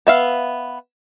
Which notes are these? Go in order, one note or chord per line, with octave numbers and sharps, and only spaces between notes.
B3 E5 F5